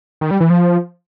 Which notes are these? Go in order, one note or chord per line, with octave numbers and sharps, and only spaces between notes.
D#3
G3
E3
F3